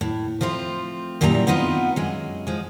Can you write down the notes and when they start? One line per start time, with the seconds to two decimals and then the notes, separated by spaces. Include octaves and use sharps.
0.01 A2
0.41 F3 A3 C4 F4
1.21 F#2 A#2 G3 E4 A5 A#5
1.47 B3 C4 D#4 F4 F#5
1.96 F#2 G#3
2.47 F3 G#3